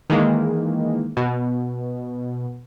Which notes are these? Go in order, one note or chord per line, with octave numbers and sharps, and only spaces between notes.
D#3 E3 G#3 A#3
B2